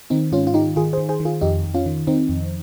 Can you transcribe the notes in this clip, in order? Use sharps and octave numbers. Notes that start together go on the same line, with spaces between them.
D#3 C4 D#4
G#2 C#4 F4
F4
D#3 D#4 G4
D#3 F4 G#4
G#4 C5
D#3
G#4 C5
D#3
F4 G#4
F2 D#4 G4
F2
C#4 F4
D#3
D#3 C4 D#4
F2